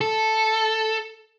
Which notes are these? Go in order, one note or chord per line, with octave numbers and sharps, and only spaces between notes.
A4